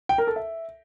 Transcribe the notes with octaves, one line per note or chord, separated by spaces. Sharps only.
G5
A#4
A4
E5